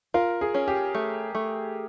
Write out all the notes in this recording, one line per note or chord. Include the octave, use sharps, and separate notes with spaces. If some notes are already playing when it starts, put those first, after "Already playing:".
F4 A#4
G#4
C#4
G4
A3
A3